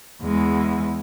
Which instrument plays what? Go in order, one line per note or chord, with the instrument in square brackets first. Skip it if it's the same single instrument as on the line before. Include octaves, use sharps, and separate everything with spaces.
[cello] E2 G#3